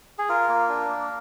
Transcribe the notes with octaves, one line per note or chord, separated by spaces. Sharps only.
G#4
F4 A#4
A#3
D4
A#3